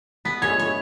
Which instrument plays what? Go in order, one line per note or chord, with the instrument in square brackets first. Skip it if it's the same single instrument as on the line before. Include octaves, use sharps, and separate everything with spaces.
[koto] B3 [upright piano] B6
[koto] C#5 [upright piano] G#6
[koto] C#5